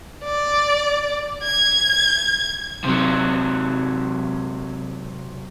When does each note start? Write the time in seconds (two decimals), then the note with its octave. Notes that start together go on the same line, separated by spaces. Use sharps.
0.24 D5
1.43 G#6
2.84 C3 F#3